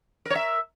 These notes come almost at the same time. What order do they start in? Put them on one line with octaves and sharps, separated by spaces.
A#4 C#5 E5